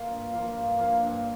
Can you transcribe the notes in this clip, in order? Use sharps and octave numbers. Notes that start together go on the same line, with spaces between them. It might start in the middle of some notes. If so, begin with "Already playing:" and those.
Already playing: A#3 F4
G2
F3 A#3 F4
G2
F3 A#3 F4
G2